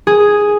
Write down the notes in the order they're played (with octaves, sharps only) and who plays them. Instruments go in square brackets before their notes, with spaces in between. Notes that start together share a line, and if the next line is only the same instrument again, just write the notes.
[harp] G#4